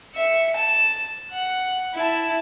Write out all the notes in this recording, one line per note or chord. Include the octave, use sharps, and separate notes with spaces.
E5 C#7
A5 E7
F#5
E4 A5